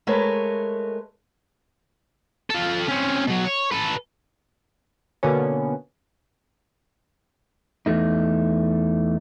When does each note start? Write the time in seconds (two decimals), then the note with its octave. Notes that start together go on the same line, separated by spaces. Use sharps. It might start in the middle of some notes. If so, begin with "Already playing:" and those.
0.07 G#3 A3 A#4 B4 C#5
2.50 F4 A4
2.88 C4 C#4
3.27 B2 F#3
3.45 C#5
3.71 A4 B4
5.23 B2 D3 A#3 B3 C#4
7.86 E2 A3 D#4